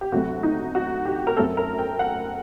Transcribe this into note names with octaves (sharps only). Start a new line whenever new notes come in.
G4
D2 C3 F#3 A3 F#4
D#4
F#4
G4
A#4
F#2 F#3 A3 C4 A4
A#4
G5
F#5